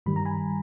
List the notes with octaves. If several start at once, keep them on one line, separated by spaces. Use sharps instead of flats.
G2 D#3 G3 B5
A#5
G#5 B5